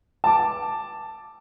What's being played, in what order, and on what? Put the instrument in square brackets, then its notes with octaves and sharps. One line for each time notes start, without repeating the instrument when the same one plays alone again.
[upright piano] A5 D6